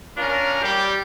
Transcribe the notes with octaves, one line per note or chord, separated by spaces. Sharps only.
C#4 D4 F4 A#4
G3 G4